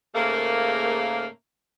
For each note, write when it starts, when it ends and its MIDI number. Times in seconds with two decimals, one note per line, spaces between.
0.15 1.26 44
0.15 1.26 49
0.15 1.26 57
0.15 1.26 58